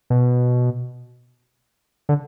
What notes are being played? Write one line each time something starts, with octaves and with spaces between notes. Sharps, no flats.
B2
D3